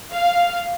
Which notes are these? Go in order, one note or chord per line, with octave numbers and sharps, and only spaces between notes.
F5